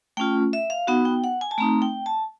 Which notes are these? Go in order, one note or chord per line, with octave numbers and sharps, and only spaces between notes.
A3 C#4 F4 G5
E5
F5
B3 D#4 F#4 F#5
G5
F#5
G#5
A5
A3 C4 D#4 A#5
G5
A5